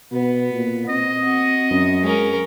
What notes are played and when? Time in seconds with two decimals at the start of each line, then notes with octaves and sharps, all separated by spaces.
0.12 B2 B3
0.53 A#2
0.89 C4 D#5
1.22 F#4
1.70 F#2
2.03 G#3 C#4 A#4